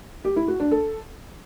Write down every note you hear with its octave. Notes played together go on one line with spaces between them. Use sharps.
G4
E4
F#4
D4
A4